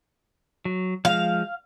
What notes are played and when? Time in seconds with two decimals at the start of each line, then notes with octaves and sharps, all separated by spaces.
0.65 F#3
1.05 F3 G#3 F5